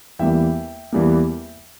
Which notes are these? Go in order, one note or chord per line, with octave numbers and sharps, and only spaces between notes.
E2 E3 G3 A#3 E5 G5
E2 E3 G3 A#3